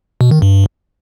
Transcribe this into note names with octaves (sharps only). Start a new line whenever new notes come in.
B2
D#3
G2